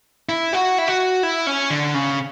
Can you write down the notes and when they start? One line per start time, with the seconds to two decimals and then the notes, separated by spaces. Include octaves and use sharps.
0.29 E4
0.53 F#4
0.78 E4
0.88 F#4
1.23 E4
1.47 C#4
1.70 D3
1.94 C#3